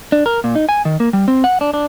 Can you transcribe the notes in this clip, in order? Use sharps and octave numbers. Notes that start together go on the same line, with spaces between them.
D4
A#4
A#2
D#4
G#5
D#3
A#3
G3
C4
F#5
D4
D4